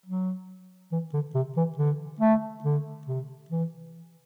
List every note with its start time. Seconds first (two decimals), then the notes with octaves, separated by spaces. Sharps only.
0.06 F#3
0.92 E3
1.13 D3
1.34 C3
1.57 E3
1.78 D3
2.20 A3
2.64 D3
3.07 C3
3.50 E3